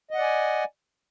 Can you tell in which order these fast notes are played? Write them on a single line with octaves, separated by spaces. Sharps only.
D#5 F#5 D5 G#5